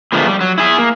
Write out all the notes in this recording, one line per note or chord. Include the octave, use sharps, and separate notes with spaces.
A#2 D3 F3 G#3 A3 B3
G3
F#3
E4 G#4
A#3